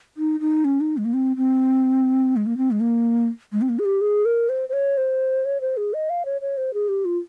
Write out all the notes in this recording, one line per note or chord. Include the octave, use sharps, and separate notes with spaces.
D#4
D#4
C#4
D#4
G#3
A#3
C4
C4
G#3
A#3
C4
G#3
A#3
G#3
C4
A#3
G#4
G4
G#4
A#4
C5
C5
C#5
C5
C#5
C5
G#4
D#5
F5
C#5
C#5
C5
G#4
G4
F4